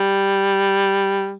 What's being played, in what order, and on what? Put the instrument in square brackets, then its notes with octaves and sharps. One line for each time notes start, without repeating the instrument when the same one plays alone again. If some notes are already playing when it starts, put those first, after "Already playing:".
Already playing: [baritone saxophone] G3